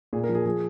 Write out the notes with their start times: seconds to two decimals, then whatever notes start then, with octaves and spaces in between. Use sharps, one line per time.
0.13 A#2 G#4
0.24 A#4
0.29 F3
0.35 G#4
0.46 F3 G#4